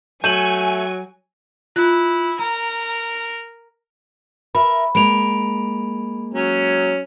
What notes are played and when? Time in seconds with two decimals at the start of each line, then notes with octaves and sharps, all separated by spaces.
0.24 F#3 A3 G#5 G6 D#7 F#7
1.76 E4 F4 F#6
2.39 A#4 A#5
4.55 A#4 E5 B5
4.95 G#3 A#3 B5 D7 F7
6.34 F#3 C#4